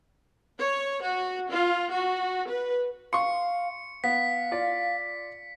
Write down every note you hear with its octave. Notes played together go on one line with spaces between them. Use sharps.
C#5
F#4
F4
F#4
B4
F5 C6 C#6 C#7
B3 F5 B6
F4 D5